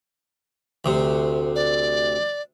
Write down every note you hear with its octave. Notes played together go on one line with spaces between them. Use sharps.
D2 C3
D5